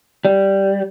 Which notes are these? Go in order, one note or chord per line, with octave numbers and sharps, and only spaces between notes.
G3